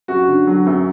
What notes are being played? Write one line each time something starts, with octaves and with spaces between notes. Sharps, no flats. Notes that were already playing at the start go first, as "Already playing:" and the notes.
F#2 F#4
D3
F#3
F#2